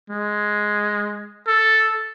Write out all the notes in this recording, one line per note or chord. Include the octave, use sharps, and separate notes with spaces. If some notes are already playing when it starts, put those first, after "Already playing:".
G#3
A4